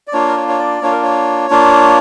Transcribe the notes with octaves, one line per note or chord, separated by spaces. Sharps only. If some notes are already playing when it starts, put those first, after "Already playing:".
D5
A#3 D4 F4 C#5
A#4
C#5
C#5
D5
A#3 D4 F4 C#5
A#4
C#5
A#3 D4 F4